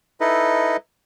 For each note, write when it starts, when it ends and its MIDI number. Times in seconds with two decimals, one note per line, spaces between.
0.20 0.77 63
0.20 0.77 64
0.20 0.77 69
0.20 0.77 71
0.20 0.77 75